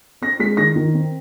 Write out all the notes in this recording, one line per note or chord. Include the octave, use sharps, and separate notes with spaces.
C4 A#6
G#3 B6
D#3 A#6
D#3
C4